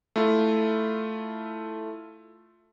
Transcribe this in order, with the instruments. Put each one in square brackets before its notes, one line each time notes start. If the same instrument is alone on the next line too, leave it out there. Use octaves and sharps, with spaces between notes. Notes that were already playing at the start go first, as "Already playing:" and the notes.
[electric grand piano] A3 E4 F4